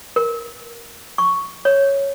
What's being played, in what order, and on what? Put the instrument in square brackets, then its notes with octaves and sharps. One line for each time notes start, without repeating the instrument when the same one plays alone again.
[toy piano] A#4
C#6
C#5